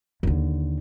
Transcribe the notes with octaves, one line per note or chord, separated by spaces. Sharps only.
D#2 D3